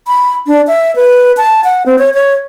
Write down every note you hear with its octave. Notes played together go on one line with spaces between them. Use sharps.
B5
D4
E5
B4
A5
F#5
C4
C#5
C#5